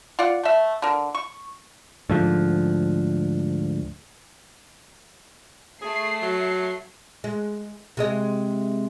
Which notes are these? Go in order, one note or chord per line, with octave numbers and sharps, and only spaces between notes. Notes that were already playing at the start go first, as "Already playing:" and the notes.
F4 D5 F#5
A3 E5
D3 A#4
C#6
D2 G#2 F3
A3 G#4 C7
F#3
G#3
C3 G#3 D#5